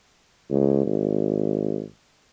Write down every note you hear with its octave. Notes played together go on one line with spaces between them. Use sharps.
C#2
G#1